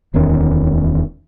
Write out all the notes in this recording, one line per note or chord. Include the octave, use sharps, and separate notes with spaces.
D1 E2 D#3 C#4